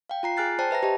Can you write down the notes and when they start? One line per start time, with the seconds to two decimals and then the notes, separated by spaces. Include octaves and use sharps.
0.10 F5 G5
0.23 F4 A#5 C7
0.37 G#4 G#5 F6 F#6 A6 C7
0.59 C5 D5 G5 A5
0.71 B4 E5 A#5 A#6
0.83 G4 D#5 A5